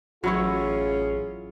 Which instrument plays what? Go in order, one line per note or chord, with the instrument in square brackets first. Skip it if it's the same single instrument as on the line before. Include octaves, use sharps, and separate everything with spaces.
[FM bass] A1 [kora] F#3 E4 C#5 [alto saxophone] C#4 [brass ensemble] F4 G#4